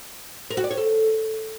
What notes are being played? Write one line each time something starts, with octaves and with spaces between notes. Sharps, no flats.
A#4
F#4
D5
C#5
A4